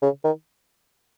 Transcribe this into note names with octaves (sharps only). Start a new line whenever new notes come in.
C#3
D#3